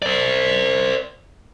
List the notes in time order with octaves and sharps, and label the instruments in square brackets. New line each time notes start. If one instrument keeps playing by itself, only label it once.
[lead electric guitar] C5 D5